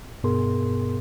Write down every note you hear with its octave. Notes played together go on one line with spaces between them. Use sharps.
G2 B2 B3 G#4 A#4 C6